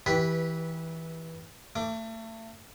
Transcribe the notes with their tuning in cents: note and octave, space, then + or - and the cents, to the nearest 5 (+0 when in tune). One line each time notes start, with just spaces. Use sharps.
E3 -15 G4 +0 B4 +0
A3 +35 D6 +0